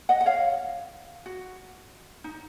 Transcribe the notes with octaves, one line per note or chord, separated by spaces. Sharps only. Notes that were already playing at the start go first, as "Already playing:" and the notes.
D#5 F#5
F#5
C#5 F5
F#4
D#4